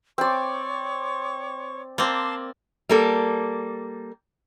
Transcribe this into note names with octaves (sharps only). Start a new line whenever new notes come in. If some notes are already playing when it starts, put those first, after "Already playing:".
C4 C#5 D5 C#6 D6
A#3 C4 D5 A5 C6 D6
G3 A#3 A4